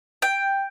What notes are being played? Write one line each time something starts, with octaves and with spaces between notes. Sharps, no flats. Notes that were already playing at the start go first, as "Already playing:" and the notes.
G5